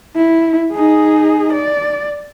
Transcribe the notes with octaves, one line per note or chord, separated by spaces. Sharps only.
E4
D#4 G#4
D5